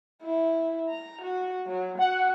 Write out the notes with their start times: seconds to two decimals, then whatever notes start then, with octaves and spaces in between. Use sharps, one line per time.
0.23 E4
0.89 A#5
1.23 F#4
1.67 F#3
1.99 F#4 F#5